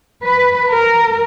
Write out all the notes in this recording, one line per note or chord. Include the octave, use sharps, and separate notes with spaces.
B4
A#4